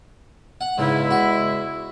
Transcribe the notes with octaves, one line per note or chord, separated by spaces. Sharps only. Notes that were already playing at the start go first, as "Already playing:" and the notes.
F#5
E2 G#2 C#3 G#3 E4
F#4